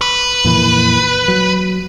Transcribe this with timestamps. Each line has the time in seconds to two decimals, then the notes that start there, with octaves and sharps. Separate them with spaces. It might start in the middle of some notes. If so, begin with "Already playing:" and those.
0.01 B4
0.45 F2 A#2 E3
1.28 F#3